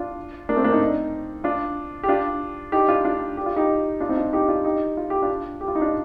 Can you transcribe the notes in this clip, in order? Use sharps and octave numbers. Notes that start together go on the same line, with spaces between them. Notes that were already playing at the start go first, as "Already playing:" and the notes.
Already playing: D4 F4
A#3 D4
A3 C4
A#3 D4
C4 D#4
D4 F4
G4
D4 F4
D#4 G4
D4 F4
D4 F4
G4
F4
D#4 G4
D4 F4
C4 D#4
D4 F4
D#4 G4
D4 F4
D#4 G4
F4
G4
D4 F4
G4
F4
D#4
D4 F4